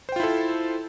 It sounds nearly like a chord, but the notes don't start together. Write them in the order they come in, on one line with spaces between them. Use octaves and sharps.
C5 G5 F4 E4 A4